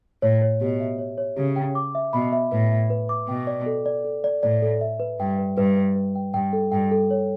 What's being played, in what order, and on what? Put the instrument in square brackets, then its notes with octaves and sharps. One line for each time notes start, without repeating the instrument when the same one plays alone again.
[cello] A2 [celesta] C#5
[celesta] C#5
[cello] B2 [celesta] G4
[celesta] E5
C#5
C#5
[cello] C#3 [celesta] G4
[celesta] G5
D6
E5
[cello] B2 [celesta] B5
[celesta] E5
[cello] A2 [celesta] B4
[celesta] E5
B4
D6
[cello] B2 [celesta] G5
[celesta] D5
A4
D5
A4
D5
[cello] A2 [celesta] D5
[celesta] A4
E5
B4
[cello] G2 [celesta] G5
[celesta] B4
[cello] G2 [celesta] B4
[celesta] B4
B4
G5
[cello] G2 [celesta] G5
[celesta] A4
[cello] G2 [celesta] G5
[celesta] A4
C#5